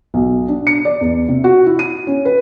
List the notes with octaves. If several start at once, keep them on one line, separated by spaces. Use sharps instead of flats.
B1
D4
C#7
D5
E2
C3
F#4
E4
D#7
C#4
B4